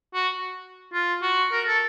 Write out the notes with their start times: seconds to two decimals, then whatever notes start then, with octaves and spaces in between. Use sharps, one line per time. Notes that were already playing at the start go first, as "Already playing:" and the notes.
0.14 F#4
0.94 F4
1.22 F#4
1.52 A#4
1.68 A4